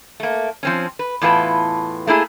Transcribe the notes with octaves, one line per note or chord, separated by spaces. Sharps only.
A3 A#3
F3 C4 C#4
B4
E2 A2 F4 B4 A5
A3 A#3 E4 G#4